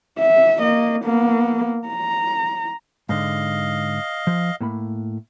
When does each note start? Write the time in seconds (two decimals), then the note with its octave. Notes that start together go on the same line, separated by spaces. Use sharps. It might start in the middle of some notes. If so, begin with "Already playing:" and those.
0.19 E5
0.60 A#3 D#5
1.04 A#3 B3
1.87 A#5
3.09 G#2 D3 D#5 F5
4.27 F3
4.61 A2 A#3 B5